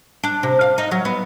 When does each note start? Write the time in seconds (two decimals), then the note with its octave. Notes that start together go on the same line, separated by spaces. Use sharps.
0.24 D4
0.43 C3
0.61 F5
0.78 D#4
0.91 F#3
1.05 B3